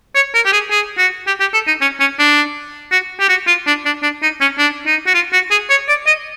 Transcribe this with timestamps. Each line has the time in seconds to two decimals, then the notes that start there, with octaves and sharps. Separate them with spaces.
0.15 C#5
0.35 A#4
0.46 G4
0.53 G#4
0.71 G#4
0.98 F#4
1.27 G4
1.40 G4
1.53 A4
1.67 D#4
1.81 C#4
2.00 C#4
2.19 D4
2.92 F#4
3.20 G4
3.29 F#4
3.47 F4
3.67 D4
3.85 D4
4.03 D4
4.22 D#4
4.41 C#4
4.58 D4
4.86 D#4
5.07 F#4
5.14 F4
5.33 F#4
5.51 G#4
5.70 C#5
5.88 D5
6.07 D#5